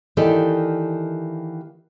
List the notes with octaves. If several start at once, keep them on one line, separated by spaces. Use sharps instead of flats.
D#3 E3 A#3 G4 A4 D5